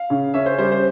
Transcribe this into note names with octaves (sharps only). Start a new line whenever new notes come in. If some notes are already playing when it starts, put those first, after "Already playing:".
Already playing: F5
C#3
C#4 E5
C5
G3 C5
C5